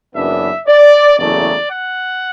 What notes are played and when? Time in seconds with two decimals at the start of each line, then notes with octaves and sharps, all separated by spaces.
0.14 F#1 F#2 E3 B3 D4 E5
0.66 D5
1.18 F#1 E2 C#3 F#3 A3 D5
1.69 F#5